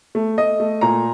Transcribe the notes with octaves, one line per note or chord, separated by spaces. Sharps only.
A3
A3 D#5
A3
A#2 A#5